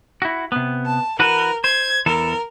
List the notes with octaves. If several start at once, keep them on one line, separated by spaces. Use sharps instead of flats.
E4 F#4
C3 B3
A5
E3 F#4 A#4 B4
C5 G#6
E2 E3 A4 A#4